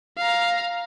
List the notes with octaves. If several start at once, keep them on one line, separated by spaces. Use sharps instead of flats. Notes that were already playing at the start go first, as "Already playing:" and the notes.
F5 A#5